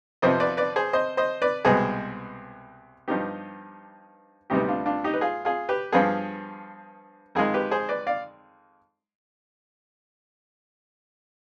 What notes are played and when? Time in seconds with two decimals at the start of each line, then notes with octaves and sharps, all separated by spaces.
0.22 F2 C3 F3 B3 C5 D#5
0.40 B4 D5
0.57 B4 D5
0.76 G#4 C5
0.93 C5 D#5
1.17 C5 D#5
1.42 B4 D5
1.65 C2 B2 G#3 B3 G#4 C5
3.08 G2 F3 B3 D#4 G4
4.50 D2 C3 G3 B3 D#4 G4
4.68 D4 F4
4.86 D4 F4
5.04 D#4 G4
5.14 B4
5.21 F4 G#4
5.45 F4 G#4
5.69 G4 B4
5.92 G2 F3 B3 F4 G#4
7.35 F2 D#3 G#3 F4 G#4
7.54 G4 B4
7.71 G#4 C5
7.89 B4 D5
8.07 D5 F5